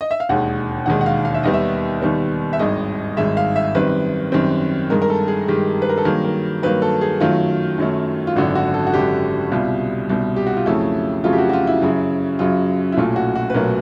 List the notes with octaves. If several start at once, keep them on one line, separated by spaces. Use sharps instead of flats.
D#5
E5
F5
E1 D#2 D#3 G#3 F#5
E1 D#2 D#3 G#3 F#5
F#5
F5
F5
E5
D#2 D#3 G3 B3 D#5
E5
D#2 D#3 G3 B3
E5
G#1 G2 D#3 G#3 D#5
G#1 G2 D#3 G#3 E5
F5
E5
F#2 D#3 G3 C4 B4
F#2 D#3 G3 C4
G2 D#3 G#3 A#4
A#4
A4
G#4
G2 D#3 G#3 G4
B4
A#4
A4
G2 D#3 F#3 A#3 G#4
A#4
G2 D#3 F#3 A#3 B4
A4
G#4
F#2 D#3 F#3 A3 F4
F#2 D#3 F#3 A3
F4
G#1 F#2 D3 F#4
F#4
A4
F#4
G#1 F#2 D3 G4
C2 B2 G3 F4
C2 B2 G3
G4
F#4
F4
F2 C#3 F#3 A3 E4
F2 C#3 F#3 A3 F4
G4
F#4
F#4
F4
E4
F#2 C#3 F#3
F#2 C#3 F#3 F4
E4
B1 A#2 F#3 A3 F4
F#4
F#4
B4
B1 A#2 F#3 A3 A#4